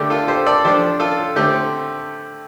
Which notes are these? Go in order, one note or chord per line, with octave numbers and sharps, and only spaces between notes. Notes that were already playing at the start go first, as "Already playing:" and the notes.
Already playing: D3 A3 D4 G4
F4 A4
G4 C5
A4 D5
F3 D4 G4 C5
F4 A4
D3 A3 C4 G4